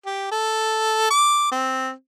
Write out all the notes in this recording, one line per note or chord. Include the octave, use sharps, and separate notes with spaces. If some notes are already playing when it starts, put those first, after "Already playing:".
G4
A4
D6
C4